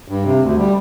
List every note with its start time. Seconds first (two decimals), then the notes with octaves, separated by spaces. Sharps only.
0.08 G2
0.25 C3
0.41 D2
0.58 G3